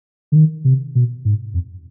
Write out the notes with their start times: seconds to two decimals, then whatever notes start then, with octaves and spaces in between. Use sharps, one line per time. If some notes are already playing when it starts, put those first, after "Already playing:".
0.32 D3
0.36 D#3
0.65 C3
0.95 B2
1.25 G#2
1.54 F2